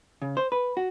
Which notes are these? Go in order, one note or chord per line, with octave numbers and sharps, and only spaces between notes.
C#3
C5
B4
F#4